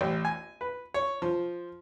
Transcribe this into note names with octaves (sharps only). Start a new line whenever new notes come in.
A1
G#5
B4
C#5
F3